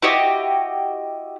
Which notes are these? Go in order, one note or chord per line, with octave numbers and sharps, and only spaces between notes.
E4 F#4 G4 D#5